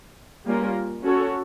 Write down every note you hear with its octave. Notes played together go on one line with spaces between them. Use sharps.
G3 A#3 C#4 F4 A#4
C#4 F#4 A4 C#5